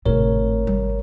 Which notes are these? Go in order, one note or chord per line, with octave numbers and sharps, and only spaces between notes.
G#1 A2 C3 A#4 C#5
G3